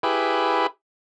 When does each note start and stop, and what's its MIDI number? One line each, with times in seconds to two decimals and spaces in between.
0.03 0.67 64
0.03 0.67 67
0.03 0.67 68
0.03 0.67 71